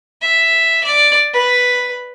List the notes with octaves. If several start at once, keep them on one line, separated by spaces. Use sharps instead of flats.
E5
D5
B4